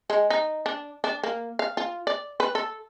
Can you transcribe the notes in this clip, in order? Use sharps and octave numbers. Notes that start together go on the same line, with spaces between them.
G#3
D#4
D4
D4
A#3
F5
F4
D5
B4
A4